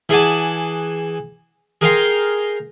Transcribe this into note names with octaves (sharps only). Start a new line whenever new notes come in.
E3 G#4 F#5 A5 D6
G#4 A#4 F5 G5 A#5 C6